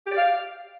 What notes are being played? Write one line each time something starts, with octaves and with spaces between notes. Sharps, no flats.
G4
D5
F5